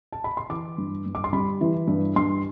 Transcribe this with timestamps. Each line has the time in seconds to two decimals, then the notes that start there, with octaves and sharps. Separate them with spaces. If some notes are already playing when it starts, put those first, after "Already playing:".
0.12 A5
0.24 B5
0.37 C6
0.49 E3 D6
0.78 G2
1.06 G2
1.15 D6
1.24 C6
1.33 G3 B5
1.61 E3
1.88 G2
2.16 G2 C6